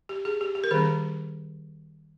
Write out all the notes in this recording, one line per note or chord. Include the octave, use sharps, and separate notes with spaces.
G4
G#4
G4
G4
A#4
D#3 G3 C4 G#4